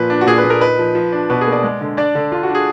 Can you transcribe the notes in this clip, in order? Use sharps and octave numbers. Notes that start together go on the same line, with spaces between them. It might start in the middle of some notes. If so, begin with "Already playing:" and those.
Already playing: A#2 F3 B4
D4
F#4
A#2 G#4
B4
A#2
A#4
D#4 B4
F3
F3
D4
B2 B4
G#4
A#3
D5
G#3
D3
D4 D5
D3
D4 F4
F#4
D4
G#4